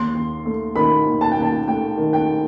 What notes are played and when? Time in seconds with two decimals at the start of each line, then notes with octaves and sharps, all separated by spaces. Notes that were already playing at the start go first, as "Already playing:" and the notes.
Already playing: D#2 C6
0.15 D#2
0.45 A3
0.75 D#3 B5
1.06 D#2
1.21 A5
1.32 D#2 G5
1.42 A5
1.67 A3 G5
1.97 D#3
2.13 G5